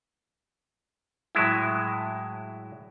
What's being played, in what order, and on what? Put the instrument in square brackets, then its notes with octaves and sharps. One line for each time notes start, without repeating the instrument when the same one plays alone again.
[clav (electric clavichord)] A2 F#3 G#3 E4